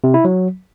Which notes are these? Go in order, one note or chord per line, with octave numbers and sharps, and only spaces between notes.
C3
E4
F#3